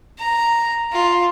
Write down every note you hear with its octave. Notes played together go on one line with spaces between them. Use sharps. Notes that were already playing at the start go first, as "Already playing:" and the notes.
A#5
F4